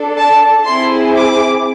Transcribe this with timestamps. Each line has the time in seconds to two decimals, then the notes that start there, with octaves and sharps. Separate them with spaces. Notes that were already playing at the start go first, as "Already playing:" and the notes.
Already playing: D4 A4
0.17 A5
0.66 C4 E4 G#4 C6
1.16 D6